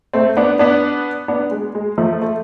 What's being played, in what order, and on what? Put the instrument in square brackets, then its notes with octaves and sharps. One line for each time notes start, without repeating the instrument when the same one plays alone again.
[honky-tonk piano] A3 C4
B3 D4
B3 D4
B3 D4
G#3
G#3
F3 A3
A3